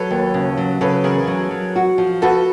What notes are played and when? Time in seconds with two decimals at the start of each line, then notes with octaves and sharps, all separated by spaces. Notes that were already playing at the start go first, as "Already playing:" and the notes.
Already playing: F#3 A4 B4
0.11 D#2
0.34 C#3
0.57 F#3
0.81 C#3 A4 B4
1.04 E2 G#4 A#4
1.27 F#3
1.51 F#3
1.76 F#4
1.98 F3
2.22 F#4 A4 B4